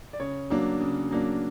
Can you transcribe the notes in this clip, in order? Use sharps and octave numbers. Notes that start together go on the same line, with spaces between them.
D5
C#3 C#5
F#3 A#3 D4
C#3
F#3 A#3 D4